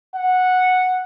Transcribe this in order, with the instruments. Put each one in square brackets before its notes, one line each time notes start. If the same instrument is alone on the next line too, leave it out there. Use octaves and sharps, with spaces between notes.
[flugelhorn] F#5